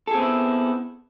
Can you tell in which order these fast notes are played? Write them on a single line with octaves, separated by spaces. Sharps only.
A4 G#4 C4 B3 E4